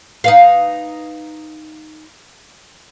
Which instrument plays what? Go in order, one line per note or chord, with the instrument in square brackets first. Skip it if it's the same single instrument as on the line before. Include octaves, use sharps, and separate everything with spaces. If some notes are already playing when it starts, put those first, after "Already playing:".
[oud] D#4 B4 F5